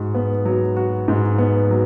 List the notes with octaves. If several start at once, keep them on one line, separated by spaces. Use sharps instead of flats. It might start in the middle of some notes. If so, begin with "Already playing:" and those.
Already playing: G#2 F#4
B3
F#3
F#4
G#2
B3
F#3